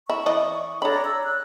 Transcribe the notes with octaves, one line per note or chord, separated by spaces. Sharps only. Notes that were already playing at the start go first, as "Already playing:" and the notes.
E4 C#6
E3 D5 D#5
D4 A4 C#5 A#5 B5
E6
F#6